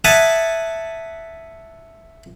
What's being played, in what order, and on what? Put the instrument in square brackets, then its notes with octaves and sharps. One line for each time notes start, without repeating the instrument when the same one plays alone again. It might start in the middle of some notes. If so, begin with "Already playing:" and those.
[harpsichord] E5 F#5 G#5 A5 D#6